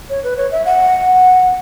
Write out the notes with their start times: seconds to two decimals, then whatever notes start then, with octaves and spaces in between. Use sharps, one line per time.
0.10 C#5
0.24 B4
0.37 C#5
0.51 E5
0.65 F#5